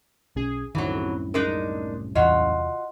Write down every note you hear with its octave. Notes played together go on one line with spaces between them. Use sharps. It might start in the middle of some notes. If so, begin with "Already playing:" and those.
B1 C#4 G#4
C2 F#2 A2 D#3 E3 F#3
G#3 D4 D#4 A#4
E2 C3 E3 F4 F#4 D#5 F#5 C6